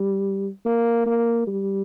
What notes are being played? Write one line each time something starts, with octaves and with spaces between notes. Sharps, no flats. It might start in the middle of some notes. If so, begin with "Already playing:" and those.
Already playing: G3
A#3
A#3
G3